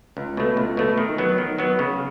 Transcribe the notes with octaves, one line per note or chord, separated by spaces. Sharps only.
C#2
B2 A3
C#2
B2 A3
D#3
F#3 B3
D#3
F#3 B3
C#3